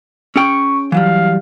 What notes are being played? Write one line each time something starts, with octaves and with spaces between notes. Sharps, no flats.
C#4 G#4 G5 C#6
E3 F#3 G3 F5